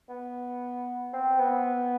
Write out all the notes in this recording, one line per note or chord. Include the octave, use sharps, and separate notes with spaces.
B3
C4
B3